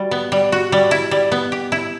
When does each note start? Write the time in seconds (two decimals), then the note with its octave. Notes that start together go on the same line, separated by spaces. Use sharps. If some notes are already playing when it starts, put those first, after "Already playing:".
Already playing: G3 F#4
0.11 B3
0.32 G3
0.52 F#4
0.72 G3
0.91 E4
1.11 G3
1.32 B3
1.52 G4
1.72 E4